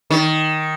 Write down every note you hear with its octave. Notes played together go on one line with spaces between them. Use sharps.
D#3